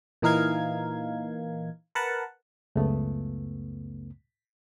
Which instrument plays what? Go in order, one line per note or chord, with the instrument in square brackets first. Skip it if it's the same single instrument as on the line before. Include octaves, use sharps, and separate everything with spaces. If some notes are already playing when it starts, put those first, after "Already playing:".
[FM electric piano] A#2 E3 D#4 A#4 F5 G#6
A#4 B4 F#5 A5
[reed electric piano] C#2 F#2 C#3 A3 B3